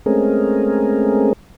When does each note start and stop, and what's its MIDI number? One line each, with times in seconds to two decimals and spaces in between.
0.06 1.33 56
0.06 1.33 57
0.06 1.33 60
0.06 1.33 61
0.06 1.33 68
0.06 1.33 70